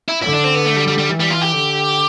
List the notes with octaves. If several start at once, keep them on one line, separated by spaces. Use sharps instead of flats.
E4
D3 E4
D4
C4
B3
A3
G3
G3
G3
E3
G3
F4
G4
D3